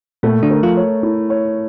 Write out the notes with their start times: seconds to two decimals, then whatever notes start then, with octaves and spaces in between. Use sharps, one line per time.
0.23 A#2 A3 A#3
0.43 D3 D4
0.50 A#4
0.63 F3 F4
0.77 C#5
1.03 E4
1.30 C#5